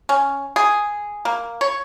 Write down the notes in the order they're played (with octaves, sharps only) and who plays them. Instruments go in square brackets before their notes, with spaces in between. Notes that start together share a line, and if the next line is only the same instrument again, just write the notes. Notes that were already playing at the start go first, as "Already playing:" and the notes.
[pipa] C#4
G#4
A#3
C#5